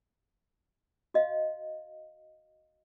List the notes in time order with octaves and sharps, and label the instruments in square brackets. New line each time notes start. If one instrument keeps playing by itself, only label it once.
[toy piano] F#4 D#5 F5